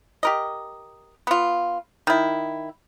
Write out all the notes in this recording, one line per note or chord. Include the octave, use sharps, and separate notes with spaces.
G4 A#4 D#5
B3 F4
D#3 E4